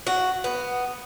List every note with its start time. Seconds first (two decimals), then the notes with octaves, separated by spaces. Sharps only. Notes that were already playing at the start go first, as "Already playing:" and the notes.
0.07 F#4
0.44 B3